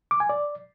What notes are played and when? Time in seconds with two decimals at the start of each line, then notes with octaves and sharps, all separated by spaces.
0.11 D6
0.20 G#5
0.29 D5